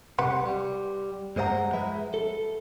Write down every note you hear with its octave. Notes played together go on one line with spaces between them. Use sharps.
C2 C3 B4 F#5 C6
G3
G2 G#3 C5 D#5 F#5 A#5
F3 G#3 B4 E5
A4